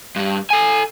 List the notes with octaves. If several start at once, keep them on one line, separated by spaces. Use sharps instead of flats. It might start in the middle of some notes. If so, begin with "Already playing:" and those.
G2 G3
A4 G#5